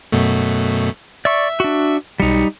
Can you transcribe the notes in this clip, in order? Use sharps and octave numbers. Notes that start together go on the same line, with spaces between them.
F#2 B2 A3
D5 E5 C#6
D4 F#4
B1 G3 D#4 C#7